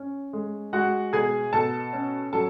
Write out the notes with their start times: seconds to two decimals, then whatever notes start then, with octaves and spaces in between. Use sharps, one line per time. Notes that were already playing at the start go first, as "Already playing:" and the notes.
Already playing: C#4
0.33 G#3
0.73 G#3 F#4 F#5
1.13 B2 G#4 G#5
1.53 B2 A4 A5
1.93 C#4
2.33 F#3 A4 A5